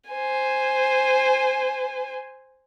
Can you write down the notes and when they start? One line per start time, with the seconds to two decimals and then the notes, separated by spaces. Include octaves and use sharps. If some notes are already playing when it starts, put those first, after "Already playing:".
0.11 C5 G#5